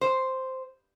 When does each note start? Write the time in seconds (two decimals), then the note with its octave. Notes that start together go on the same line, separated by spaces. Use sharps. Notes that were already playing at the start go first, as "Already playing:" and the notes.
0.01 C5